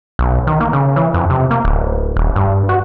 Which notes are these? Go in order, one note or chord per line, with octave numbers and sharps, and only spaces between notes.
B1
D#3
A#3
C#3
E3
F2
C3
A#3
D1
D#1
G2
F#4